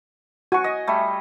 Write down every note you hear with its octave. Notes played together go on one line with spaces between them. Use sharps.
F#4 G#5 C#6
D#5
G3 A3